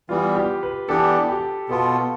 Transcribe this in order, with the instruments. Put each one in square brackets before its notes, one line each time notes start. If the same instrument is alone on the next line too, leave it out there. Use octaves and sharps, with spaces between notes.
[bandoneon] E3 G3 B3 [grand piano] F4
[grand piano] G4
B4
[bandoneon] E3 B3 D4 G4 [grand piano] A4
[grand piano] G4
[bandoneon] B2 B3 F4 [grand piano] A4